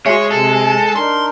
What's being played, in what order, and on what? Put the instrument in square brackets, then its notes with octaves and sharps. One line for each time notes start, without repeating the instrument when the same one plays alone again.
[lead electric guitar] G#3 [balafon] F#4 E5 [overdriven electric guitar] C#5
[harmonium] C3 [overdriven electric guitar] A4
[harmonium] D4 D#4 A#4 [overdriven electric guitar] C6